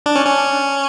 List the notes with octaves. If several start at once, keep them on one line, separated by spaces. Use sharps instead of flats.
D4
C#4
C#4